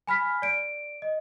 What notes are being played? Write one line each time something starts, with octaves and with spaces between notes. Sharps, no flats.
G#5 B5 F6 B6
D5 D7
D#5